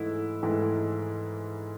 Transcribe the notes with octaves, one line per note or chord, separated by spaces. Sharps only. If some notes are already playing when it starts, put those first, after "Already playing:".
Already playing: G#2 E3 A3 E4
G#2 E3 A3